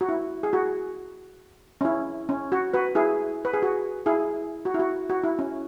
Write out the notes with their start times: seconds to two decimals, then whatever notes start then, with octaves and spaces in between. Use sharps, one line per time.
0.01 F#4
0.09 E4
0.43 G#4
0.53 F#4
1.81 C#4
1.85 E4
2.29 C#4
2.52 F#4
2.74 F#4 B4
2.95 E4 G#4
3.45 B4
3.53 G#4
3.62 F#4
4.06 E4 G#4
4.65 F#4
4.74 E4
4.79 F#4
5.10 F#4
5.24 E4
5.39 C#4